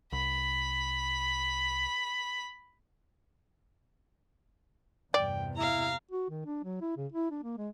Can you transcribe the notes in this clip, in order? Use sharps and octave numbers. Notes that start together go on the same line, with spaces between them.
C2 B5
E2 G2 C3 D5 G5
E4 F5 A#5
F#4
D#3
D4
F#3
E4
C#3
E4
D4
A#3
G#3